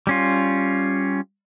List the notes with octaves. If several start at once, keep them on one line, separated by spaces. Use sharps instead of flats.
G3 C#4 F4